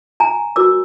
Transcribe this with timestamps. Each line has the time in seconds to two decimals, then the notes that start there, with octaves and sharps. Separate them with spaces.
0.20 G#5 A#5
0.56 F#4 A#4 C#5 D6 E6